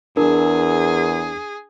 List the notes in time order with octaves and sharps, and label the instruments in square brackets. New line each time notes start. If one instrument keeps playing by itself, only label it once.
[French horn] E2 [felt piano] D4 [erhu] G#4 [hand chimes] A#4